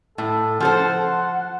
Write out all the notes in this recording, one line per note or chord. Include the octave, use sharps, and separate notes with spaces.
A2 A4
F3 A4 C5 F#5